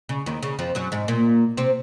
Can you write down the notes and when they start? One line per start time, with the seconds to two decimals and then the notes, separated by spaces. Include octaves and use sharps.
0.09 C#3
0.26 D#2 D#3
0.43 C#3
0.59 F2 F3
0.75 F#2 F#3
0.92 G#2 G#3
1.08 A#2 A#3
1.57 C3 C4